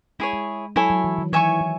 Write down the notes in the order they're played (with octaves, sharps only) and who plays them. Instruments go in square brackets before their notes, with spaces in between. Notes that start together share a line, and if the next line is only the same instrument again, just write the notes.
[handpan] G#3 [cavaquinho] E4 G#4 C#5
[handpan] G#3
[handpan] F#3 [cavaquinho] E4 A4 C#5 G#5
[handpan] F#3
E3
D#3
[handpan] E3 [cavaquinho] C#5 E5 G#5 C#6
[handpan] E3